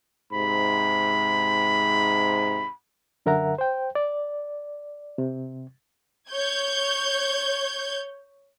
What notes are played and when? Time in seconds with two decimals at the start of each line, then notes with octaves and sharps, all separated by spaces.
0.33 G#2 C3 B5
3.26 F#2 D3 A#4 E5 F#5 A#5
3.58 C5 G5
3.95 D5
5.18 C3
6.30 C#5 G6 G#6